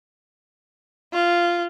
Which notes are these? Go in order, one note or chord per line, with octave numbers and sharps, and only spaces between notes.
F4